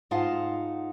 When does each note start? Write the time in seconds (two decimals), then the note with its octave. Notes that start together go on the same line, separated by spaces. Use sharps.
0.11 G#2 D#4 F4 F5 F#5 A5